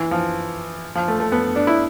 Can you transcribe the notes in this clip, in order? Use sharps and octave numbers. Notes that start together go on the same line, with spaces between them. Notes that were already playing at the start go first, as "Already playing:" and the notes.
Already playing: E3
F3
F3
A3
A3
B3
D4
E4